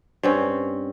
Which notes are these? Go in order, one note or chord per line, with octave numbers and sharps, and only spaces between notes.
G2 C4 C#4